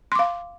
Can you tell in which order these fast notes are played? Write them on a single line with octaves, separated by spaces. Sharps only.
C6 D6 F5